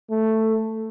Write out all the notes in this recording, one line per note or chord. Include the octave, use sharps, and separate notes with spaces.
A3